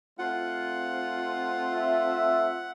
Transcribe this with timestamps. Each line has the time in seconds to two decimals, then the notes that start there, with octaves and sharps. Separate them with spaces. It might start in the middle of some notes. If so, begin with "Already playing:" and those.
0.19 A3 C4 F4 F#5
1.73 E5